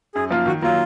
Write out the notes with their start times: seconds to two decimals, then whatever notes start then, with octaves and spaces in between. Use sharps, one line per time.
0.15 F#2 G#4
0.30 F3 A#3 F4
0.46 D#3 F#4
0.62 F#3 A#3 F4